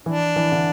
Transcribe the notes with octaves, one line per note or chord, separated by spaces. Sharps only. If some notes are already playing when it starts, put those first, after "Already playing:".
E3 D4
E3
D3